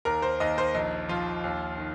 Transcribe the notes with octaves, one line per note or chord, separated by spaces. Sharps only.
D#2 A#4
C5
D#2 D#5
C5
A#1 D#4
F3 F4
D#2
D#3